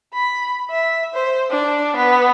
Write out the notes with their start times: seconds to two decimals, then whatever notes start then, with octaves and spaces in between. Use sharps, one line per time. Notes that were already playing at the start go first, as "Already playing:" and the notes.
0.13 B5
0.70 E5
1.14 C5
1.50 D4
1.96 B3